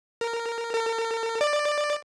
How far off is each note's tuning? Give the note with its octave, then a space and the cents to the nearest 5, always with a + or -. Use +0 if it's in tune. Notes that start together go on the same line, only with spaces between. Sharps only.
A#4 -10
A#4 -45
D5 +10